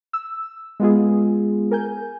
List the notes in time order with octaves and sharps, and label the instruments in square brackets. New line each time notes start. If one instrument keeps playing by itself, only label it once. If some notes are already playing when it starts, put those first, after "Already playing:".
[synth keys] E6
G#3 B3 F4 G#4
A#4 G#5 G6